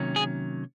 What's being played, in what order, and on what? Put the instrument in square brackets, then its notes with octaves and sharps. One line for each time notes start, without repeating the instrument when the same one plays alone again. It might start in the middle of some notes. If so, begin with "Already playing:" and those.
Already playing: [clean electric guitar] C3 D#3 F#3 A#3 C#4
G#4